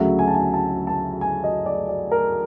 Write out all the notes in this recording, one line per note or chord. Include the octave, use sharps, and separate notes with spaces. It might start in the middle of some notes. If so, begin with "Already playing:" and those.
Already playing: D2 C#3 F#3 E5
G#5
A5
G#5
A5
A5
G#5
D#5
D5
D5
A#4